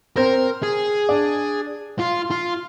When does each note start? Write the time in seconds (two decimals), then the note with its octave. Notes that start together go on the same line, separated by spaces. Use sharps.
0.16 C4 A#4 C5
0.63 G#4
1.09 D4 D5
2.00 F4
2.31 F4